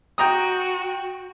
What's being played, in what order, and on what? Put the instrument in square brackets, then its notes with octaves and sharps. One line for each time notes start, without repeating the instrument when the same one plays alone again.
[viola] F#4 [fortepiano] G5 A#5 D#6